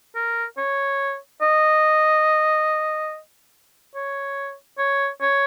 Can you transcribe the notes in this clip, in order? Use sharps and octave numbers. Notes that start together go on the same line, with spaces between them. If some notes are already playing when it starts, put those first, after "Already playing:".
A#4
C#5
D#5
C#5
C#5
C#5